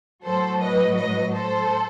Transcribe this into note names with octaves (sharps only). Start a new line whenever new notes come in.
A2 F#3 A4 C5
B4 D#5
B4 D#5
A4 C5